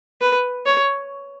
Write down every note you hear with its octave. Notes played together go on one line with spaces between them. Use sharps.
B4
C#5